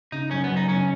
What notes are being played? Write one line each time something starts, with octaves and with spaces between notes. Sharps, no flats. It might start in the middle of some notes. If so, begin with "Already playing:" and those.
C#3 D#4
F#2 C#4
B3
F#2
D#4
C#3 C#4